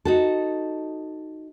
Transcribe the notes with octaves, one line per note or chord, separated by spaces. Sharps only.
D#4 F#4 A4